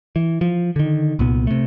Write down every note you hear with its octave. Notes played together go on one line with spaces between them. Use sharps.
E3
F3
D3 D#3
C2 A#2 B3
C3 A3